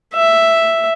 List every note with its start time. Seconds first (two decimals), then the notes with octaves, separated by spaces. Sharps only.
0.14 E5